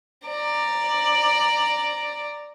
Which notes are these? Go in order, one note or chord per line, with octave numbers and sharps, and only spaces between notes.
D5 A#5